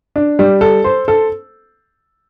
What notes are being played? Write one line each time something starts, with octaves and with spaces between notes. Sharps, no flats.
D4
G3
A4
C5
A4